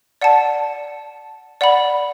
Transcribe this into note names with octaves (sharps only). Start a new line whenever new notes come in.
D5 F#5 A5
D5 F#5 B5